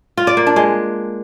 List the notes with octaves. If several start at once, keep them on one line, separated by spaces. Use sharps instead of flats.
F4
D5
A#3
D4
G#3